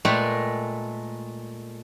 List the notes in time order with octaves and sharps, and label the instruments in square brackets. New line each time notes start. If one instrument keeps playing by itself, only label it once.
[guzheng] A#2 G#3 A3 B4 G5